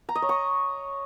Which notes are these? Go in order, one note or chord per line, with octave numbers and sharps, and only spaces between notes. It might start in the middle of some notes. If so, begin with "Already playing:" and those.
A#5
D#5
C#5
C#6